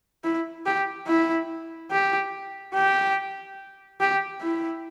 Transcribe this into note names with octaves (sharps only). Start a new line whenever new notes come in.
E4
G4
E4
G4
G4
G4
E4